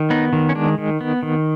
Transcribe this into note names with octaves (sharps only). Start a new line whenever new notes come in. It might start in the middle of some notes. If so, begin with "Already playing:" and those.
Already playing: D#3
B3 D#4
D#3
C#4
G#3 D4
D#3
B3
D#3